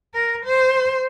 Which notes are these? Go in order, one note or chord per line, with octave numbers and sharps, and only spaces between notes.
A#4
C5